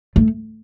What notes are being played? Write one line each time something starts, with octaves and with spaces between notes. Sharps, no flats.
A3